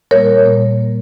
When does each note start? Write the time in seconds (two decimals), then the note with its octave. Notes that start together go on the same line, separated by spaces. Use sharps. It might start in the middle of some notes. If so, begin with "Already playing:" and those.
0.11 A#2 G3 A#3 A#4 C#5
0.45 A#2 G3 A#3